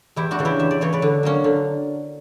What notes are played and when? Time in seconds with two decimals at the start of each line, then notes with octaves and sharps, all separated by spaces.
0.16 E2 E4 G4
0.31 D4 F#4
0.39 C#3 E3
0.45 E4 G4
0.59 E2 E5
0.71 D5
0.81 C#3 E3 C#5
0.93 B4 D5
1.02 D3
1.23 F#3 A#3 C#4
1.44 D3